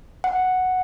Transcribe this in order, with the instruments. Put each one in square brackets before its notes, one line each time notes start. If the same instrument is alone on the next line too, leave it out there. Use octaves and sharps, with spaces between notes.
[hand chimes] F#5